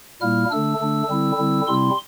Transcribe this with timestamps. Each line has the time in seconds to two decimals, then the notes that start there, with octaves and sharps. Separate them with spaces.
0.21 A#2 G3 A#3 E4 F6
0.50 D3 A3 D4 E6
0.79 D3 A3 D4
1.08 D3 G3 C4 E4
1.38 D3 G3 C4 E4
1.66 C3 G3 C4 E4 C6